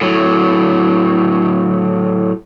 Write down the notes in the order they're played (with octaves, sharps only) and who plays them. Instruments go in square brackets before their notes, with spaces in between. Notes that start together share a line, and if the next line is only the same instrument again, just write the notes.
[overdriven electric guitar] A2 F#3